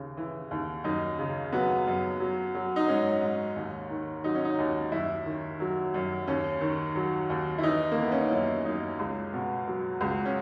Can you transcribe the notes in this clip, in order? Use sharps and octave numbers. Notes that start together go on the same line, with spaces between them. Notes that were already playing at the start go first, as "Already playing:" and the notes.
Already playing: D#2 C#3
E3
D#2
F#2 D#4
C#3
F#3 B3
F#2
F#3
F#3
D#4
G#2 C#4
G#2
D#2
D#3
F#3 D#4
C#4
D#4
D#2
F#2 E4
D#3
F#3
F#2
D#2 C#4
D#3
F#3
D#2
E4
E3 D#4
A#3
E3
B3
C#4
D#4
F#2 E4
F#2 D#4
C#2
B2
F#3
C#2
C#4